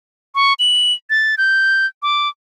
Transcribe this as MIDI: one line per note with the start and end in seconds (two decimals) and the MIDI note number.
0.35 0.54 85
0.59 0.93 102
1.10 1.35 93
1.38 1.86 91
2.02 2.29 86